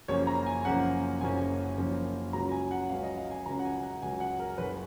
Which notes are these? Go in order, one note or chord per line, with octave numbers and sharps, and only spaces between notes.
F#1 F#2 F3 A#3 C#4 C#5
A#5
G#5
F#1 F#2 F3 A#3 C#4 F#5
F#1 F#2 F3 A#3 C#4 G#5
F#1 F#2 F3 A#3 C#4
C#2 C#3 F#3 C#4 A#5
G#5
F#5
C#2 C#3 F#3 C#4 F5
D#5
F5
G#5
C#2 C#3 F#3 C#4 A#5
F#5
G#5
F#5
C#2 C#3 F#3 C#4 G#5
F#5
A#4
F#1 F#2 C#3 B4